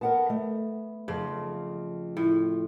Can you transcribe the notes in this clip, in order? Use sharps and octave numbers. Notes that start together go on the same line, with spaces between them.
B3 A#4 F#5 A5
A3
F2 C#3
A2